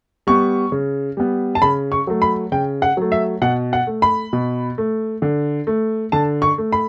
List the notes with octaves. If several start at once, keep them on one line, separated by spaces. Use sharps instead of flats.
G3 B3 C#6
C#3
G3 B3
A5
C#3 B5
C#6
F#3 A3
B5
C#3 G5
F#5
F#3 A3
E5
B2 F#5
F#5
A3
B5
B2
A3
D3
A3
D3 A5
C#6
A3
B5